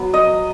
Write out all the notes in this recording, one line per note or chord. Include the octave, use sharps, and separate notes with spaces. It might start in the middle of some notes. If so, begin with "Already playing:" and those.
Already playing: F#3 B3
D#5